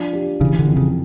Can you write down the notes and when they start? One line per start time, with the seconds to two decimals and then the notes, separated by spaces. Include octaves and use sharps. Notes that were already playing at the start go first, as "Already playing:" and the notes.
Already playing: F3 D4
0.13 G4
0.41 C#3 E3
0.59 D3
0.67 F2
0.77 C#3